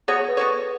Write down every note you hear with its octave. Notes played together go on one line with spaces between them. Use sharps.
B3 F#4 G#4 C#5
C#5
B4
B3 F#4 A4 C#5